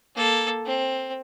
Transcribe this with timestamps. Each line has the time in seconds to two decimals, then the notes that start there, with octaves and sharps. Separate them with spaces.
0.16 A#3 A4
0.65 C4